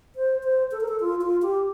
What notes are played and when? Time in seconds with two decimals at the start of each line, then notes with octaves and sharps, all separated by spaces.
0.15 C5
0.43 C5
0.71 A4
0.80 A#4
0.88 A4
1.00 F4
1.21 F4
1.42 G4